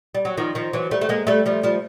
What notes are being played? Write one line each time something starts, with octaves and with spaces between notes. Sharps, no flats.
G3
F#3
D#3 F3
D#3 F3
E3 F#3
G3 A3
A3
G#3 A#3
G3 A3
F3 G3
F3 G3